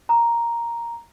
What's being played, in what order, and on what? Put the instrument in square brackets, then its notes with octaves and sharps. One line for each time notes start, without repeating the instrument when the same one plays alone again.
[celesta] A#5